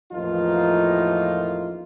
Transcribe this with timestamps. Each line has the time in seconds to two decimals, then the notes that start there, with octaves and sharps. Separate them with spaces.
0.12 A1 E2 F3 A#3 D#4 F4